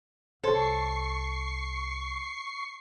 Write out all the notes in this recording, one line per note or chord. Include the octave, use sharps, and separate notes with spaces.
C2 A4 C5 C#5 C6 C#6 C7